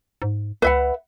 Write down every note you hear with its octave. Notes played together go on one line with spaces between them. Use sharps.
G#2
C#2 B4 E5 F#5